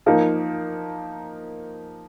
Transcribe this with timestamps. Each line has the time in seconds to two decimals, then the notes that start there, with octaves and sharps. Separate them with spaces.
0.06 F3 A#3 D#4